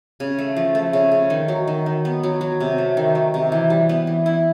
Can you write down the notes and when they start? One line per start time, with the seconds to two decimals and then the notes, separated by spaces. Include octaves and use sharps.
0.20 C#3
0.39 A3
0.57 F3
0.75 A3
0.93 C#3
1.12 C#3
1.30 D#3
1.48 F#3
1.67 D#3
1.86 D#3
2.05 B3
2.23 F#3
2.41 F#3
2.60 C3
2.78 A3
2.97 D#3
3.15 F#3
3.34 C3
3.52 E3
3.70 G3
3.89 B3
4.07 E3
4.26 E4